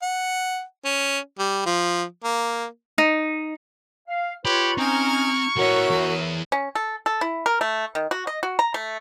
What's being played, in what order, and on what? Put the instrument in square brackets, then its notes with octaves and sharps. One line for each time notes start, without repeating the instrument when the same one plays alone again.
[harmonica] F#5
C#4
G3
F3
A#3
[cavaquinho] D#4
[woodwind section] F5
[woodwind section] F4 B4 C#5 [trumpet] G4 [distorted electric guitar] B5
[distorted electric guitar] C4 [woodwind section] C#4 D#4 [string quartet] A#5 F6 G#6 [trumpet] C#6
[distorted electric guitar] E3 C#4 [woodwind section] F#4 [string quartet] A#4 C#5 E5
[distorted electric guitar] E2 G#4
[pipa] C#4
A4
A4
E4
A#4
A3
D#3
F#4
D#5
F#4
A#5
A3